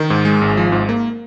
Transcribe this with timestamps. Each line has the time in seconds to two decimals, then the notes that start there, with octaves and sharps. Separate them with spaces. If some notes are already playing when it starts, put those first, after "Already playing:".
Already playing: D#3
0.10 G#2
0.25 G#3
0.41 G#1
0.57 F3
0.72 G#2
0.89 A#3